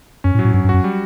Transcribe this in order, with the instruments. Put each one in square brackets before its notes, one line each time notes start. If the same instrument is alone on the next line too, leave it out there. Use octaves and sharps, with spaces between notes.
[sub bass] F#2 [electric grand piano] C#4
[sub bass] A2
[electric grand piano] F#3
[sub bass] A2
[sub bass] G2 [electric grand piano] F#3
[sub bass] G2
[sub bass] F#2 [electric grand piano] F#4
[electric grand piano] G3